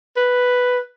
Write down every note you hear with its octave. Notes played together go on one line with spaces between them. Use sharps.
B4